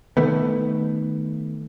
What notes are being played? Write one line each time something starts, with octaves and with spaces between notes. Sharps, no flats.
D#3 A3 B3